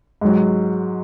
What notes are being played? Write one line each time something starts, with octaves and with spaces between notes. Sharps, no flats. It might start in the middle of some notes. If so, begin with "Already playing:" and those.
G#2 F#3